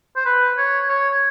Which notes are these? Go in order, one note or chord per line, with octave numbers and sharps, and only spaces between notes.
C5
B4
C#5
C#5